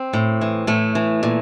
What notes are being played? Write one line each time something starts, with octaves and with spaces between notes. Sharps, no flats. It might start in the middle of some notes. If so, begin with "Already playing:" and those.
Already playing: C4
A2
E3
A2 A3
E3
A#2